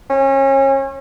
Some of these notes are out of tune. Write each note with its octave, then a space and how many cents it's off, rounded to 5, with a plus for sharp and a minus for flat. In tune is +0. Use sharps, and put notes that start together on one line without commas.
C#4 -30